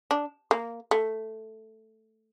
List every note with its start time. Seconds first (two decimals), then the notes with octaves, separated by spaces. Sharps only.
0.11 D4
0.51 A#3
0.91 A3